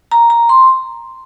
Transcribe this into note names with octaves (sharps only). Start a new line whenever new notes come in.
A#5
A#5
C6